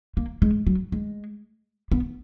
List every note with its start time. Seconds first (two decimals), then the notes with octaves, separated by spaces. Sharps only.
0.17 A#3
0.42 G#3
0.67 F#3
0.92 G#3
1.92 B3